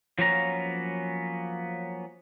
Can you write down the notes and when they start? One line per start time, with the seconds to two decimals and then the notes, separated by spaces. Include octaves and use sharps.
0.19 F3 F#3 A#3 B3 C#4 A#5